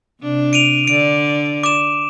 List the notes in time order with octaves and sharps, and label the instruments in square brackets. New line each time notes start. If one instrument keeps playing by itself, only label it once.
[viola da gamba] C3 D4
[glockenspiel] D7 D#7 F7
[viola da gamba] D3 D5 [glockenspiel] D7
[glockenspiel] D6 E7